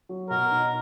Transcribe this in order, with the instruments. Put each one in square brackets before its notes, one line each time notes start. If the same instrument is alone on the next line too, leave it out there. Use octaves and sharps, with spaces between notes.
[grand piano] F#3
[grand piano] B2 [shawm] A#4
[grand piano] D#4